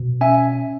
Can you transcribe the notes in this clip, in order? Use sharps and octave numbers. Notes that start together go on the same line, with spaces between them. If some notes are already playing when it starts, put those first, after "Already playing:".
Already playing: B2
C#4 E5 G#5